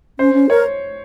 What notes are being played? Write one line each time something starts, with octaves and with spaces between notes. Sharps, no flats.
C#4 C5
C#4
A#4 C#5